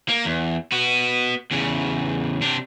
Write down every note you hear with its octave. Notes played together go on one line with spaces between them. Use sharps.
A#3
E2
B3 F#4
E2 C#3
C3 D4